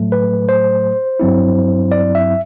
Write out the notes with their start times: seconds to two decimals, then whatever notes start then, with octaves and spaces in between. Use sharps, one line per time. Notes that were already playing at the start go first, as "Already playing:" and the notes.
Already playing: A2 F#3 A3
0.12 B4
0.49 C5
1.20 G2 F#3 C4 E4
1.92 D5
2.15 E5